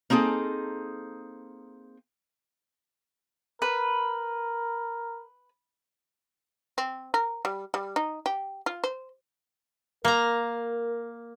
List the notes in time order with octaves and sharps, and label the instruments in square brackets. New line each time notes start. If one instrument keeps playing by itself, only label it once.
[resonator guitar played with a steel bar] A#3 C4 D#4 G#4 A4
[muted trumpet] A#4 [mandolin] B4
[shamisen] C4
A#4
G3
G3
D#4
G4
F4
C5
[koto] A#3 A#5 [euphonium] A#4